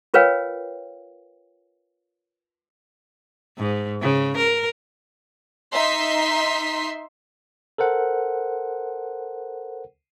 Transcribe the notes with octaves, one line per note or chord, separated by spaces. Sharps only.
F4 A#4 B4 C#5 F5 G5
G#2
C#3
A#4
D#4 E5 C6 B6
A4 A#4 C5 F#5